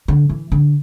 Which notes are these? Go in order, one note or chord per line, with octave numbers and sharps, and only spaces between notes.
D3
E3
D3